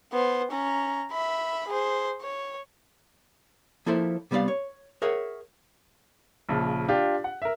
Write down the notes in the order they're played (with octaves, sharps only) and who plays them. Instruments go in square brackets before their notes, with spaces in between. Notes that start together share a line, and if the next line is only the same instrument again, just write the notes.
[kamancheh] B3 C5
C#4 A#5
E5 B5
G#4 C5
C#5
[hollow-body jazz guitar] F3 A#3 E4 A4 C5 E5
C3 G3 B3 D5 F5
C#5
G#4 A#4 C#5 E5 F#5
[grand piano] A#1 C#3 F3
D4 F4 G4
F#5
A#4 E5